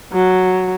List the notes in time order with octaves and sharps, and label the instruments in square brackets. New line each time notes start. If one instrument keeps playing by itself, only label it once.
[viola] F#3